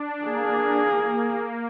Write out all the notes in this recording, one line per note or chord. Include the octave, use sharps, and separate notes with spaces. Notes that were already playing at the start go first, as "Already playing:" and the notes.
Already playing: D4
A#3 G#4
A#3
A#3